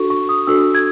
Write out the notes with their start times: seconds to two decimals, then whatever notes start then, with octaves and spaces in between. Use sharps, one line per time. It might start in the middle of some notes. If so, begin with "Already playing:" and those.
Already playing: D4 F#4 A4 C#6
0.10 C#6
0.29 D#6
0.47 D4 F#4 A4 E6
0.75 G#6